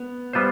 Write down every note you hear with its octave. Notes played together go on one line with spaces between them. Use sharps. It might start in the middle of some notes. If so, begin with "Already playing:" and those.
Already playing: B3
G3 B3 F4 C5